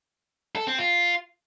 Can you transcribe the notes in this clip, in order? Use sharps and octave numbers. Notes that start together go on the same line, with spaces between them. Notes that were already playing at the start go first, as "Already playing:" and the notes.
A4
C4
F4